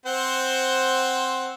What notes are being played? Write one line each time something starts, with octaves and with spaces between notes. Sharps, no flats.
C4 C5 F#5